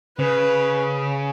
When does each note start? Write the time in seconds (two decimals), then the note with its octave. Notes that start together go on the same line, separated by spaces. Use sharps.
0.19 C#3 B4